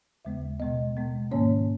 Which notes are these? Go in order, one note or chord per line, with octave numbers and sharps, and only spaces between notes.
D#2 C#3 G#3 B3 E5
B2 G#3 B3 D#5
B2 G#3 B3
G#2 D#3 A#3 C#4 C#5